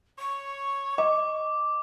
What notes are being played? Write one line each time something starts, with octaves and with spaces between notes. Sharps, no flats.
C#5 C#6
D#5 D6